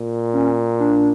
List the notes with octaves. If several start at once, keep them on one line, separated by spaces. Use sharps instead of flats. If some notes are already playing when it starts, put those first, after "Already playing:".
Already playing: A#2
C#4
D4